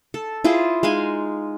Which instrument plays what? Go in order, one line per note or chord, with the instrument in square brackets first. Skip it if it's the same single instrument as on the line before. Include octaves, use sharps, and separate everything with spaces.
[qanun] A4
E4 F4 G#4 C5
G#3 D#4 F5 G#5